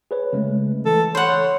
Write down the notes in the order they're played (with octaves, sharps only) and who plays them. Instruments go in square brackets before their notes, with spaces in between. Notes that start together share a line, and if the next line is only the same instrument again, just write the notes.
[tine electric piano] G#4 B4 C#5
C#3 G#3 A3
[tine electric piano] E3 [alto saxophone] A4
[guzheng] C5 F#5 [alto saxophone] C#5 [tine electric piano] B5 C6